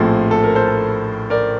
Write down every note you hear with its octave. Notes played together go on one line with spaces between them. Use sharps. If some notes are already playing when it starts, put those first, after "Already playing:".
Already playing: A#1 A2 F3 C4 A4
A4
A#4
A4 C5
A4
A#4 D5